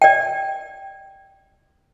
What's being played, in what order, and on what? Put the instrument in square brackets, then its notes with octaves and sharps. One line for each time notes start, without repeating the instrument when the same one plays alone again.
[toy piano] D5 G5